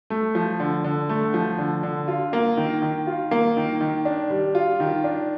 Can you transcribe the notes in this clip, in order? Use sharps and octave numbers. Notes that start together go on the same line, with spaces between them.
A3
F3
D3
D3
A3
F3
D3
D3
F4
A#3
D#3
D#3
F4
A#3
D#3
D#3
D4
G3
F4
D#3
D4